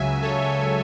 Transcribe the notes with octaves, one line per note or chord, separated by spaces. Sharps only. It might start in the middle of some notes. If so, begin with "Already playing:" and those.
Already playing: C#2 C#3 F#3 E5 G#5
A4 C#5